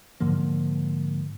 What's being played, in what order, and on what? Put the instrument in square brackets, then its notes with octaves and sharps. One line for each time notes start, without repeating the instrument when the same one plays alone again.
[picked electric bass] G#2 D3 F3 A#3